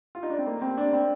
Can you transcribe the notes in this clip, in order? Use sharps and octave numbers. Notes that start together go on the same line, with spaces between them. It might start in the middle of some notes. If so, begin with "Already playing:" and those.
F4
D#4
D4
C4
A#3
C4
D4
C4